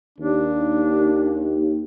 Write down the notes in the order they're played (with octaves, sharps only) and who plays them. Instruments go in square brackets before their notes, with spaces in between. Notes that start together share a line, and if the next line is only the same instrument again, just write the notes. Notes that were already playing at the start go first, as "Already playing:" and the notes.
[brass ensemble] D#2 [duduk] D4